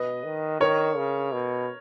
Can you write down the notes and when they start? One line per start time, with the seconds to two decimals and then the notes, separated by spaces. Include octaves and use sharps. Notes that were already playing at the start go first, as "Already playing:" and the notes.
Already playing: B2 B4 D#5
0.24 D#3
0.60 D#3 A#4 C#5
0.97 C#3
1.33 B2